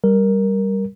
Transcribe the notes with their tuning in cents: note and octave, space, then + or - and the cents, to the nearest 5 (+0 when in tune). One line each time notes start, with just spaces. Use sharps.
G3 +0 A#4 +5